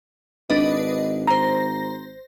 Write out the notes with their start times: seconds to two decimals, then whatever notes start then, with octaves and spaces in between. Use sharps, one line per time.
0.50 G#1 D4 B4 D#5
1.27 C5 A#5 A#6